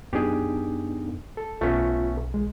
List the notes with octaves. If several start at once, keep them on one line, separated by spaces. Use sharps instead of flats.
F#2 B3 D4 D#4 G4 G#4
A4
B1 A3 B3 C#4 F4
G#3